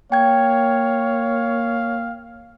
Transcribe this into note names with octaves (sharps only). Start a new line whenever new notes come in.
A#3 C#5 F5 G5 G#6